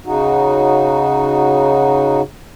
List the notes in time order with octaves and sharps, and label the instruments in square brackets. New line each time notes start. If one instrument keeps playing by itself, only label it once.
[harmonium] C#3 D#4 F#4